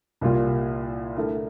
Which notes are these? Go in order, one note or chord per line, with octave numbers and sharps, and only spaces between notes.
C2 A#2 G3 A#3 F4
D3 A3 E4 A#4